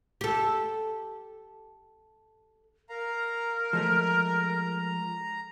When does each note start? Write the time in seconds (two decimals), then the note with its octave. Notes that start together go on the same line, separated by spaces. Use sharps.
0.21 G4 A4
2.89 A#4 F5 A#5
3.73 F3 G#3 A3 A#5